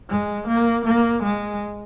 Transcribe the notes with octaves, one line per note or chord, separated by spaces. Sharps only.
G#3
A#3
A#3
G#3